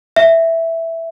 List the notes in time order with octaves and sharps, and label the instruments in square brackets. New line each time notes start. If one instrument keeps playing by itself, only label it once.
[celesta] E5